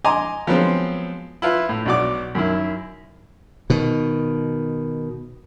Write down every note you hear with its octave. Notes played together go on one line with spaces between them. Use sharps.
D#5 G#5 A#5 C6 D6
F3 F#3 G#3 B3 C4
E4 F4 B4
A2
B1 B2 F#4 D5 D6
F#2 D#3 E4
B2 D#3